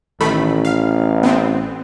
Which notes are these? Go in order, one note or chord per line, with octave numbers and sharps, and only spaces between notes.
A1 D#3 A3 B5
F5
B3 C4